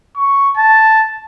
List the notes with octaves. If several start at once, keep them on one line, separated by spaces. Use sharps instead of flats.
C#6
A5